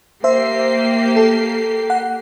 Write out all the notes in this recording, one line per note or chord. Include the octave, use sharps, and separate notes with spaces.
A#3 G4 C5 E5 C7
A4
F#5